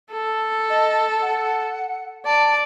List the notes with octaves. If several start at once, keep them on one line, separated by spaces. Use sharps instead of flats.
A4
D#5
F#5
D5 A5